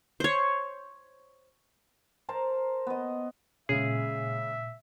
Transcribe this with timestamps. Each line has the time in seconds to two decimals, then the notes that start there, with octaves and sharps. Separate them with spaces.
0.20 C5 C#5
2.29 A#4 C5 A5 A#5
2.87 B3 D#5
3.69 A#2 C#3 G#3 G#4 E5